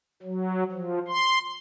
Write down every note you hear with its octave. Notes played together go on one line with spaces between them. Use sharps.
F#3
F3
C6